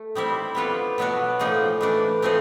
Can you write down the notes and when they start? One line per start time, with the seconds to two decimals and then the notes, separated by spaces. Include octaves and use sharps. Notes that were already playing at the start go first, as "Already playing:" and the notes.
Already playing: A3
0.15 D#3 G3 C4 E4
0.55 G3 B3 D4 F4 A4
0.98 B2 F#3 B3 D4 F#4
1.39 A2 F3 A#3 D#4 G#4
1.81 E3 A3 D4
2.22 F3 A3 C4 D#4 G#4